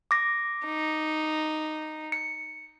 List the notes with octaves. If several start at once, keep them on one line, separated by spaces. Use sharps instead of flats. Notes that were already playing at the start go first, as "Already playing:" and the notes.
D6 A#6
D#4
C#7